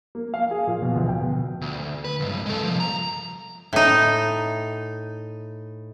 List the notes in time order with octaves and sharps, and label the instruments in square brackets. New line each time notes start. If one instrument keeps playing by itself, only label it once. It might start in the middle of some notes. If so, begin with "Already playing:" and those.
[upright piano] A#3
F5
G#4
A#2
B2
D2
G5
B2
[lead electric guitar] D2
B4
C#2 G2
G#3 A4
C2 F3
A#5
[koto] A2 D#4